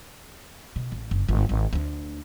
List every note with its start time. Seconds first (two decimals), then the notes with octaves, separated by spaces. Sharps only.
0.76 B2
0.92 A1
1.11 F#1
1.28 G1 G#2
1.49 G#1
1.73 D2 D4